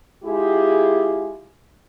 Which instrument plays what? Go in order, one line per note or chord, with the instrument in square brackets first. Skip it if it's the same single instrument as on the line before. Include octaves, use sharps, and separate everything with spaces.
[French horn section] G#3 E4 F4 G4 G#4